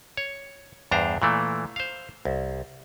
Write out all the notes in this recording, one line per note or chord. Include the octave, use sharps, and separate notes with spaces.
C#5
E2 G2 D4 C5 A#5
A#2 E3 A3
C5 F5
C2